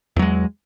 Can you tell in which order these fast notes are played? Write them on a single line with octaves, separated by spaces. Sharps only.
E2 F#3 G#3